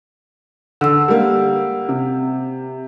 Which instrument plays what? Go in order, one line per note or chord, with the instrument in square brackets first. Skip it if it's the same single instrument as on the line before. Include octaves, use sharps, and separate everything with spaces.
[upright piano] D3 [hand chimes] F#5 E6
[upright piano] G3 A#3
C3